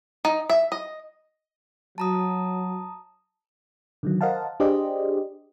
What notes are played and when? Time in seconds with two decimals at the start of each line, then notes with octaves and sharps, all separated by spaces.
0.25 D#4
0.50 E5
0.72 D#5
1.98 F#3 A5 A#5 D#6
4.03 D3 D#3 F#3
4.21 A#4 C5 D#5 F5 F#5 A5
4.60 D4 G4 G#4 C5 D5 D#5